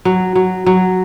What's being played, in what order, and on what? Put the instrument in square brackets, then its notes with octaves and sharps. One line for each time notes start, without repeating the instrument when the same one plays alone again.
[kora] F#3
F#3
F#3